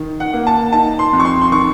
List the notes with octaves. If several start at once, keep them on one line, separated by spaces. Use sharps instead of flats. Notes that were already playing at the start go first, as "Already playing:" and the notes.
Already playing: D#3
F#5
A#3
A5
D#4 A5
C6
F2
C#6
C6
C6
D#3 C#6